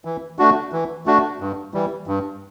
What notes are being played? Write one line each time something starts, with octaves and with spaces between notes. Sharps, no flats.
E3
A3 D4 F#4
E3
A3 D4 F#4
G2
E3 G3
G2